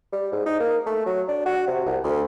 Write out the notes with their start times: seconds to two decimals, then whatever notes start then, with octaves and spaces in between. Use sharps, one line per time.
0.12 G3
0.32 G#2
0.46 D#4
0.60 A#3
0.86 A3
1.06 F#3
1.29 D4
1.46 F#4
1.67 C3
1.86 C2
2.04 D2